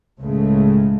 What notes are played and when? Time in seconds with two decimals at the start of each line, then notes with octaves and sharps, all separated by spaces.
0.22 C#2 A2 C#3 G#3 A3